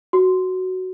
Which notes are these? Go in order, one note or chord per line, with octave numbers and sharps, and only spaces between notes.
F#4